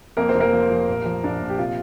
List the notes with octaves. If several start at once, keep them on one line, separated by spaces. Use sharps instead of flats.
F2 A#3 A#4
C4 C5
F1
A#3 A#4
F3
F1
A#1
F3
A#1 D4
A#1
G4
C3 F4